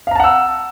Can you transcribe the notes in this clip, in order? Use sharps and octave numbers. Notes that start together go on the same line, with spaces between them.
F5 F#5 A5 A#5 E6